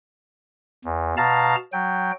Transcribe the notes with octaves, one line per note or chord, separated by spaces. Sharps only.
E2
B2 F5 A5 A#5 A6
F#3 G5